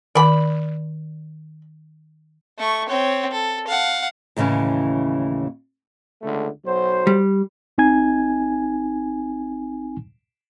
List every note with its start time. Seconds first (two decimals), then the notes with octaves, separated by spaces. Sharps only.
0.15 D#3 D5 B5
2.59 A3 C#6
2.89 C4 C#5
3.32 A4
3.68 F5 F#5
4.36 D#2 A2 C#3 E3 C#4
6.22 C#2 D3 A3
6.65 B1 F#3 C5
7.07 G3
7.78 G#1 C4 D#4 G#5 G#6